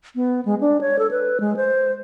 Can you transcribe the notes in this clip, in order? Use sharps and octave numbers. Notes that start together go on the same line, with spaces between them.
B3
G#3
D4
C#5
A4
B4
G#3
C5